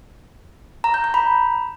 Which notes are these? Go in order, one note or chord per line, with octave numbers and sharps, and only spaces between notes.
A#5
G6
A#5
B5